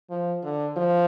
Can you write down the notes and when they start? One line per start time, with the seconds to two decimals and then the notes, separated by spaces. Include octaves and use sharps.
0.10 F3
0.43 D3
0.76 F3